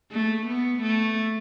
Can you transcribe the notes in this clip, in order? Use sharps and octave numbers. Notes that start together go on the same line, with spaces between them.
A3
B3
A3